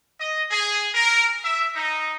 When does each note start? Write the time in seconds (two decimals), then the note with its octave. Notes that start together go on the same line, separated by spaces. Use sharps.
0.19 D#5
0.51 G#4
0.94 A#4
1.44 E5
1.75 D#4